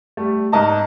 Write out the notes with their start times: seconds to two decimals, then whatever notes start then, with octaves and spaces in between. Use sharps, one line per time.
0.17 G3 A3
0.52 G#2 A#4 D#5 A5